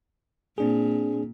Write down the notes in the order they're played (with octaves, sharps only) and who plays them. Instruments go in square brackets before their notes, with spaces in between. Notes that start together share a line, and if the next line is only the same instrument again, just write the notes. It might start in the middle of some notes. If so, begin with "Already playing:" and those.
[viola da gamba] A#2 [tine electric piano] C4 D4 G#4